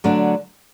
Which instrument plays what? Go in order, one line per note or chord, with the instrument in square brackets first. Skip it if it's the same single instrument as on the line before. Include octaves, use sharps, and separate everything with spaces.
[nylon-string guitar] D3 F#3 A3 D4